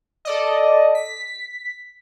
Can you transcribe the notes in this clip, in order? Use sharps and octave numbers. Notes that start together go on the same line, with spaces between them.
A4 D5 D#5
B6